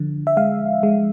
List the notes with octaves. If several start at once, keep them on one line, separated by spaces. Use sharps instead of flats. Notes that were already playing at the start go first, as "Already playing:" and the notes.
Already playing: D3 F3
E5
G#3 F5
G#3